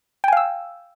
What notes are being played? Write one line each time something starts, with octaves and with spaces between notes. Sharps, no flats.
F5 G5 G#5 E6